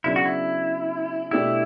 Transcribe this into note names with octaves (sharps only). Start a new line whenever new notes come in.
C#3 F#3 B3 D4 E4
F#4
E4
B2 A3 D4 E4 G4